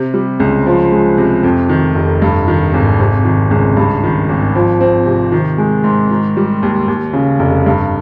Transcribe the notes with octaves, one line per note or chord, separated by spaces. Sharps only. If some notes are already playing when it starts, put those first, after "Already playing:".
Already playing: C3
G3
C#2
F3
G#3
C3
F2
D#3
F1
G2
D#3
G#1
C3
D#3
C#2
G2
D#3
G#1
F3
C4
C3
D#3
G#3
G#2
D#3
G3
D#2
D#2
C#3
F1
G2